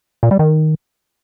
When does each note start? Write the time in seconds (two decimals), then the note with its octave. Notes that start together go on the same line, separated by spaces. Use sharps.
0.23 A#2
0.31 G3
0.39 D#3